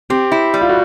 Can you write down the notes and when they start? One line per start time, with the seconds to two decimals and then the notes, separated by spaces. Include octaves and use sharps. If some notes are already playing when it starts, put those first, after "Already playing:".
0.10 C4 G4
0.32 E4
0.54 G3
0.61 F4
0.69 F#4